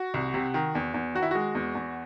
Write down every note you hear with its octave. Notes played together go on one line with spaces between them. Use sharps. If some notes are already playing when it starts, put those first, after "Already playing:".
Already playing: F#4
C2
C3
D#3
E2
E2
D#3 F#4
E4
G#3 F#4
E2
E2